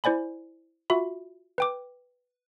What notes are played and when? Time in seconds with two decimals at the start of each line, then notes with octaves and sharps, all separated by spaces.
0.04 E4 C5 D5 G#5 B5
0.90 F4 F#4 E5 B5
1.58 B4 G5 D6